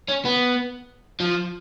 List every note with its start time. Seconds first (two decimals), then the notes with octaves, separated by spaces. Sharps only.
0.09 C#4
0.25 B3
1.20 F3